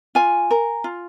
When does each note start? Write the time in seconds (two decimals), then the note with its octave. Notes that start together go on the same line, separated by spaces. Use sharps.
0.15 F4 G#5
0.51 A#4
0.84 F4